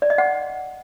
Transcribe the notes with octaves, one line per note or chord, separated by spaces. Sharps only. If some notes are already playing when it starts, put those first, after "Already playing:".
D5
D#5
F#5